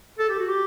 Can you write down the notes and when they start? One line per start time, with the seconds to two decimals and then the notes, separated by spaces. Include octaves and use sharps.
0.19 A4
0.29 G4
0.39 F#4
0.49 G4